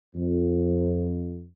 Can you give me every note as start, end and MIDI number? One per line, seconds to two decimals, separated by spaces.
0.15 1.44 41